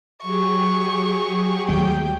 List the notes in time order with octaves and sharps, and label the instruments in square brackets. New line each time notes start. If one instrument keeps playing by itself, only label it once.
[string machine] F#3 G4 G#4 [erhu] C#6
[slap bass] D#2 G3 A3 [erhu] G5